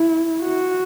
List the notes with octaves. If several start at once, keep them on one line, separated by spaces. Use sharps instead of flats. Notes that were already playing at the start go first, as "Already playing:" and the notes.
Already playing: E4
F#4